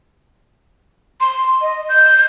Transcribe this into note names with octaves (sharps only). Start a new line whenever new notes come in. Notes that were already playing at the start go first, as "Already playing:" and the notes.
C6
D#5
G6